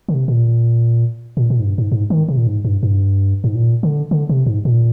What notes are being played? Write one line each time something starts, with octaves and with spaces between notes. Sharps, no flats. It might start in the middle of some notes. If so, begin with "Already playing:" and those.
D3
C3
A#2
A#2
A#2
G#2
G2
G#2
G#2
D#3
C3
A#2
G#2
G2
G2
G#2
A#2
D3
D3
C3
G#2
A#2